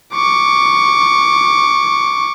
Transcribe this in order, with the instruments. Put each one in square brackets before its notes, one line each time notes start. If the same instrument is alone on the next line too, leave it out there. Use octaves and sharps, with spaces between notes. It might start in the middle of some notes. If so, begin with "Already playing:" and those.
[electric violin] C#6 D6